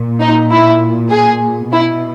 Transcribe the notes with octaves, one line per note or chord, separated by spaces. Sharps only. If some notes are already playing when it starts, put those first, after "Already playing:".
Already playing: A#2
D#4
E4
G#4
B2 E4